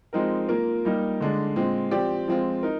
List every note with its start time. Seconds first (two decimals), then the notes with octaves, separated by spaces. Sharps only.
0.13 F3 G#3 C4 D#4 A#4
0.48 A#3 F4 A#4
0.85 G3 A#3 D#4
1.21 D3 G#3 D4
1.56 A#2 G#3 C4
1.91 F3 C4 G4 D5
2.28 F3 G#3 C4 F4
2.63 D#4 A#4